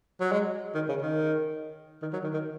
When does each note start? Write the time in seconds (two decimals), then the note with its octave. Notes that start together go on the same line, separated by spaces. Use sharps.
0.21 F#3
0.32 G#3
0.75 D#3
0.89 C#3
1.02 D#3
2.02 D#3
2.13 F#3
2.24 D#3
2.34 D#3